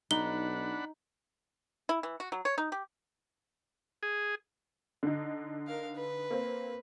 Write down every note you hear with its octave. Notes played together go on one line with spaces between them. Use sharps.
B1 D4 D#4 F#5 B5 G7
E4
E3
F#4
F#3
C#5
D#4
G4
G#4
D3 D#4
A#4 F5
B4
A#3 C4